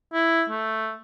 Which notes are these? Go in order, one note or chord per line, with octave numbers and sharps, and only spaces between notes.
E4
A3